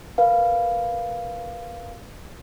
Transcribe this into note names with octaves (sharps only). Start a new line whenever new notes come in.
A#4 B4 F5